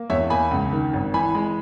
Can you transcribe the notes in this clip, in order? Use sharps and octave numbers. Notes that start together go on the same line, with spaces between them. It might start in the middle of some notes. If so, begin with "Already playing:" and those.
Already playing: A#3
E2 C#5 E5
A#3 G#5 B5
C#2
D#3
G#1
E3 G#5 B5
G#3